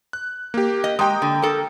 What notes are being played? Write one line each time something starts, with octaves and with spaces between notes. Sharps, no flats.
F#6
A#3 G4
D#5
G#3 G4 G5 A#5 D#6
D3
A4 A#4